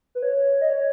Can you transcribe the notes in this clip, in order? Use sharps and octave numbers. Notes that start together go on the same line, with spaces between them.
B4
C#5
D#5
C#5